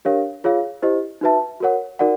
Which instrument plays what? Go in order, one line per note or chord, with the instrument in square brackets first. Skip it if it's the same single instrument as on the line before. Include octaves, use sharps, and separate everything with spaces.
[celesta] D4 G4 A#4 C#5 F5
F4 G#4 C#5 F5
E4 G4 C5 D#5
D#4 F#4 B4 E5 A5
F#4 A#4 C#5 F#5
D#4 F#4 A#4 D5 F#5